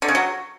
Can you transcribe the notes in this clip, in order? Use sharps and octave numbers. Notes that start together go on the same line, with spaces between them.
D3
C#3
F#3